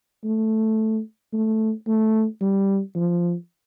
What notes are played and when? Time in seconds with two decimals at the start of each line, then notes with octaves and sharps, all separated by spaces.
0.24 A3
1.33 A3
1.87 A3
2.41 G3
2.96 F3